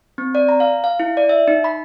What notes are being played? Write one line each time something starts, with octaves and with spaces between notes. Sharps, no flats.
C4
D5
A#5
F5
F5
E4
D5
E5
D#4
B5